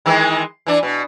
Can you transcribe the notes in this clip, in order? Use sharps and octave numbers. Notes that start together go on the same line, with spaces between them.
D#3 E3 G#3
E3 D4
B2